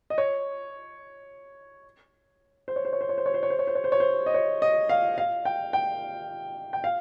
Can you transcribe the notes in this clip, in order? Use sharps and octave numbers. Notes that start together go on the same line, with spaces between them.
D#5
C#5
C5
C#5
C5
C#5
C5
C#5
C5
C#5
C5
C#5
C5
C#5
C5
C#5
C5
C#5
C5
D#5
C#5
D#5
F5
F5
G5
G5
G5
F5